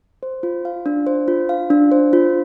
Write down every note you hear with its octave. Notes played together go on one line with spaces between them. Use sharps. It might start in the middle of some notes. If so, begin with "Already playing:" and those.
C5
F4
F5
D4
C5
F4
F5
D4
C5
F4